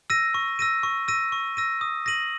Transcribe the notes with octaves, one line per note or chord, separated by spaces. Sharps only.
E6 A#6 D#7
C#6
E6 A#6 D#7
C#6
E6 A#6 D#7
C#6
E6 A#6 D#7
D#6
A#6 D#7 F#7